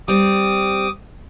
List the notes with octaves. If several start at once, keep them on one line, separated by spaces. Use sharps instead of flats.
G3 C4 D6 D#6